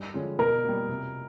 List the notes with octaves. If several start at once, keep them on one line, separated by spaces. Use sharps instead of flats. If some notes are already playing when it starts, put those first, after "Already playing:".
Already playing: G2
D3 F3 G#3 C#4
B2 A#4
G3 A#3
C3